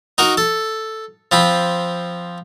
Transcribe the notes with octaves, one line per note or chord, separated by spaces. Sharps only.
D#4 F#4 A#4
A4
F3 C4 B5